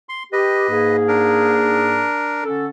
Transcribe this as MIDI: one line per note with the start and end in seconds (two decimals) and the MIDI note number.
0.09 0.23 84
0.33 0.65 67
0.33 0.97 71
0.33 0.97 75
0.69 2.05 44
0.69 2.05 58
0.69 2.05 68
1.08 2.44 62
1.08 2.44 70
2.43 2.67 50
2.43 2.67 61
2.43 2.67 69